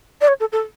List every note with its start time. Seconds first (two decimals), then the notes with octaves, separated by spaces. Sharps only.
0.21 D5
0.28 C#5
0.40 A4
0.52 A4